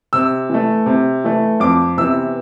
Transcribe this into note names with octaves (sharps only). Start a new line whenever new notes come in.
C3 E6
E3 A3
C3
E3 A3
F2 D6
C3 E3 B3 E6